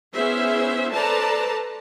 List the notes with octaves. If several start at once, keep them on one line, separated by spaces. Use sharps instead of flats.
B3 C#4 E4 G#4 C5 E5
A4 B4 C5 D5 A5 A#5